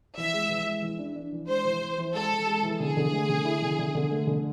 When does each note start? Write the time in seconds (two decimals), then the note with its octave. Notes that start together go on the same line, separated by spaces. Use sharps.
0.17 E3 E5
0.33 G#3
0.49 E3
0.67 G#3
0.82 E3
0.99 D4
1.16 D4
1.32 E3
1.48 G#3 C5
1.65 E3
1.81 E3
1.98 E3
2.14 G#3 A4
2.31 E3
2.47 G#3
2.63 E3
2.80 D3 G#4
2.97 D3
3.12 A3
3.29 D3
3.45 E4
3.62 D3
3.79 D3
3.95 D3
4.11 A3
4.27 D3